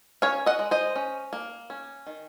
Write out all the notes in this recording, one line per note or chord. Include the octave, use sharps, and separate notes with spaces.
C#4 C#5 F5
D#5 F#5
G#3
C5 D#5
C#4
A#3
C#4
D#3